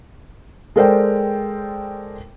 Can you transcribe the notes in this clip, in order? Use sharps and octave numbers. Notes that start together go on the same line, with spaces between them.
G#3 A4 A#4 C5 D5 G5